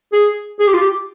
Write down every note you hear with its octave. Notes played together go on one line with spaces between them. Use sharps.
G#4
G#4
G4
F4
G4